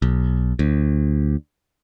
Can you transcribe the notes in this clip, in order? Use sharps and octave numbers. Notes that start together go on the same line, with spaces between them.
B1
D2